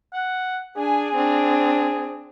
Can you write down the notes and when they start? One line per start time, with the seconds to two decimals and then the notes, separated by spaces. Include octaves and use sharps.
0.13 F#5
0.77 D4 G#4 G#5
1.15 C4 D4